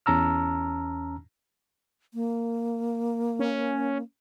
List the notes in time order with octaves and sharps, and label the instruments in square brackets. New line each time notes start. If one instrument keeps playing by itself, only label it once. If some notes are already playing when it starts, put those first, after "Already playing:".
[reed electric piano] E2 C#4 A5 A#5 E6 F6
[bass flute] A#3
[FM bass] C#4